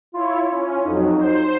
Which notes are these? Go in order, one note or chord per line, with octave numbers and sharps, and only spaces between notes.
E4 F4 C#5
C#4
F2 F#3 D#4
C5